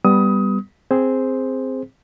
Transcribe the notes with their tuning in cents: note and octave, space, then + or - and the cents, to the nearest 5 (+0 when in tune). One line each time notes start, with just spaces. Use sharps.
G3 +0 B3 +0 D#6 +20
C4 +0 G#4 +0 C5 +0